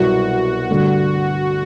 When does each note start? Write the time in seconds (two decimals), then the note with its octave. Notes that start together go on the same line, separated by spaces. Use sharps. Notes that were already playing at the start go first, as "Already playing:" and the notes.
Already playing: C2 B2 F#3 F#4
0.69 G2 D3 A3